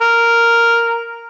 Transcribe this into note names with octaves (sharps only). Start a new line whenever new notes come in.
A#4